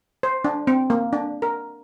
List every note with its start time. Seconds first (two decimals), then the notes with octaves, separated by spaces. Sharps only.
0.23 C5
0.45 D4
0.67 C4
0.90 A#3
1.13 D4
1.42 A#4